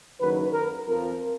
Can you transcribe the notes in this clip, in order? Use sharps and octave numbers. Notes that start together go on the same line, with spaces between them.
F#1 F#2 D#3 F#3 B4
A#4
F2 F3 A#4